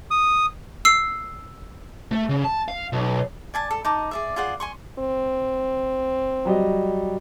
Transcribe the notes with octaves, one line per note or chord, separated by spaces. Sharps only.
D#6
E6 C7
A3
C#3
A5
F5
B1
D5 G#5 A5
A4
D#4 D#5 A5 D6
G#4 D5 E5
F4 G#4 D5 F#5
G#5 C6 C#6
C4
F#3 G3 D#5